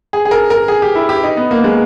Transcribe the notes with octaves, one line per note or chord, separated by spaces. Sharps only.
G#4
G#4
A#4
A#4
G#4
G4
E4
G4
D#4
B3
A#3
G#3